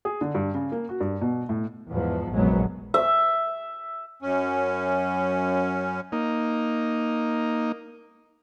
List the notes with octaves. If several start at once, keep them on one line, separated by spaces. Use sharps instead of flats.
G#4
D3
G2
C#3
A#3
F#4
G2
B2
A2
E2 G#2 F3 B3
F1 A#1 F#2 F#3 G#3 B3
E5
F#2 C#4
A#3 D#4